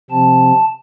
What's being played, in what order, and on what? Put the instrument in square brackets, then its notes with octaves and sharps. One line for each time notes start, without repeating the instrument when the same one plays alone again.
[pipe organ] C3 F3 C4 A5